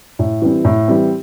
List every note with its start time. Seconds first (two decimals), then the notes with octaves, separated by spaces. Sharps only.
0.19 A2
0.42 E3 G3 C4
0.65 A2
0.88 E3 G3 C4